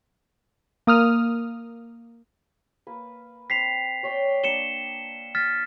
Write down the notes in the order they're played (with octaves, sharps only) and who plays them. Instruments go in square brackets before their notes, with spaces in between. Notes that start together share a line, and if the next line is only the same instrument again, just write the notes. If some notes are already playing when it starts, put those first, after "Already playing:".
[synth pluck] A#3 D#6 F6
[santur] A#3 B4
[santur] C4 [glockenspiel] B6 C7 F7
[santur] C#5 D5 G5
[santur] A#3 D4 D#6 [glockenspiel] C#7 E7 G7
[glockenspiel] F6 A6 B6